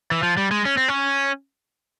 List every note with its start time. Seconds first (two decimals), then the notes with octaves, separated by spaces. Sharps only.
0.11 E3
0.23 F3
0.37 G3
0.51 G#3
0.65 C#4
0.77 C4
0.88 C#4